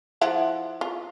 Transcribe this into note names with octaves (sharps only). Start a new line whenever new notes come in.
F3 E4 F#5
F4